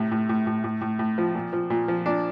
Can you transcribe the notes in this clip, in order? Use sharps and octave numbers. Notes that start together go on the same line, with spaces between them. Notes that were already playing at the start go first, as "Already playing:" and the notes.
Already playing: A2 C3
A2
A2
A2
A2
A2
A2
F3
A#2
F3
A#2
F3
A#2 D4